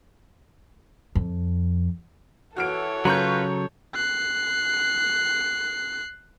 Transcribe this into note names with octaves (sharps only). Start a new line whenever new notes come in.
F2
E3 F#4 A4 C#5 F6 D7
C#3 F#3 C#4 F4 B4 A#5 C#6 G6
F#6 C7